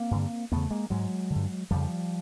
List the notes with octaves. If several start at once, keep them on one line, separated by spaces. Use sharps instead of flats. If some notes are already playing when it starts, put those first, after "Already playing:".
Already playing: A#3 C4
G2 D3
E2 C#3 A3 B3
G#3 A#3
G#2 F#3 G#3
D3
G2
F2 C#3 F3 G3